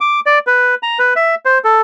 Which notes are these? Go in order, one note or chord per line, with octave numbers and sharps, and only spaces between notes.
D6
D5
B4
A#5
B4
E5
C5
A4